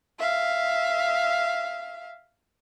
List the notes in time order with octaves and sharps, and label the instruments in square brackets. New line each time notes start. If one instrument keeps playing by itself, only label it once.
[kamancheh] E5 F5